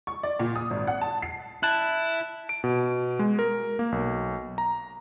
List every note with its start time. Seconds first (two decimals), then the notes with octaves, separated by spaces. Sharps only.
0.07 C#6
0.23 D5
0.40 A#2
0.56 D#6
0.71 G#1
0.87 F#5
1.01 A5
1.22 C7
1.63 E4 A5 F#6
2.49 D7
2.64 B2
3.19 G#3
3.39 A#4
3.79 A#3
3.92 B1
4.58 A#5